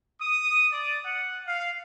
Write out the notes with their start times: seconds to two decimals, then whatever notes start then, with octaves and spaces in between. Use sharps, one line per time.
0.21 D#6
0.72 D5
1.06 F#5
1.47 F5